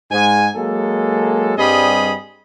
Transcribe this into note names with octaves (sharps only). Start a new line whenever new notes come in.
G#2 G#5
F#3 G#3 A#3 A4
G2 G3 C4 G#4 D#5 B5